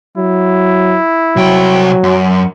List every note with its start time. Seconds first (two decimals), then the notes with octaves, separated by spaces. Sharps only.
0.17 F#3 E4
1.36 C2 F#3 G5
2.03 F#2